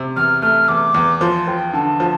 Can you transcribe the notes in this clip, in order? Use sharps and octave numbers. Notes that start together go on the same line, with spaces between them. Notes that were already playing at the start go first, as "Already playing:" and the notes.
Already playing: C3
E2 F6
A3 F6
E2 D6
E2
F3 C6
F3 G5
D3 A5
F3